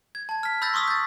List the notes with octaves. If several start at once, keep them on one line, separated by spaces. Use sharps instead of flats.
G#6
A5 G#6
F6 B6
B5 E6 G6 A6 A#6
C6 C#6 D#6 E6 B6
G6 A6